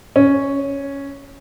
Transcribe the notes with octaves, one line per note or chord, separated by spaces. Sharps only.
C#4